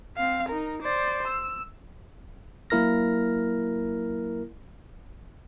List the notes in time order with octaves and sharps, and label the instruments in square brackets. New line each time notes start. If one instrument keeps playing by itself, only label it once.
[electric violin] C4 F5
D#4 A#4
C5 D5
E6
[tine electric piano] F#3 A#3 E4 A#4 F6 A#6